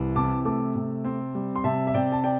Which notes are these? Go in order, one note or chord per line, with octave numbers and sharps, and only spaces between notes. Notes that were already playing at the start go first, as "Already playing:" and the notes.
Already playing: C2 E3
C3 A5 D6
A3 A5 D6
C3
C4
G3
C6
C3 E5 A5
E5
C3 D5 G5
A5
D5 G5